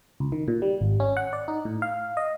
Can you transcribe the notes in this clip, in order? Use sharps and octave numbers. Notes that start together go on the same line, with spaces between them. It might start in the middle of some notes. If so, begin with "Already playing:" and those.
C#2
D#3
A#2
G3
G#1
C#4
F#5
D5
D#4
A2
F5
D#5